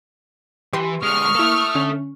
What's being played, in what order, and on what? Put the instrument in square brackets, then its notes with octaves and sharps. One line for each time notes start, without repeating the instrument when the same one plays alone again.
[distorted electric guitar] E3 [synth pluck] G4 B4 C6
[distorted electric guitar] D3 G#3 [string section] C#6 F6 [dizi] D#6
[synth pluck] A#3 E4 [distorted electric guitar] A4 E5
[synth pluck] D3 C#4